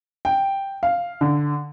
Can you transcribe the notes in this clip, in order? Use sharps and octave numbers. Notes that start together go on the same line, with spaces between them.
G5
F5
D3